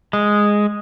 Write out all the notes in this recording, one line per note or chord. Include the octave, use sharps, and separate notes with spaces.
G#3